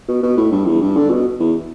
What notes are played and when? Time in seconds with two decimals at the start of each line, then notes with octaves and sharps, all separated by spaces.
0.08 B2
0.23 B2
0.37 A2
0.52 G2
0.66 E2
0.82 G2
0.96 D3
1.10 B2
1.40 E2